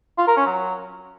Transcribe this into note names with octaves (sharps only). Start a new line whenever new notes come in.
F4
A#4
C#4
F#3